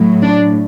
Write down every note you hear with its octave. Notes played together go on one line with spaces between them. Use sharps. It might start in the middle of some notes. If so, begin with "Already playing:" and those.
Already playing: A2 F#3
D4